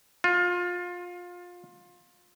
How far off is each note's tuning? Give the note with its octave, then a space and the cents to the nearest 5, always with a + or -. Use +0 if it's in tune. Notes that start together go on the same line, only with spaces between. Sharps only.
F4 +20